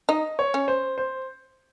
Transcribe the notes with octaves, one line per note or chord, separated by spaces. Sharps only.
D#4 D#5
C#5
C#4
C5
C5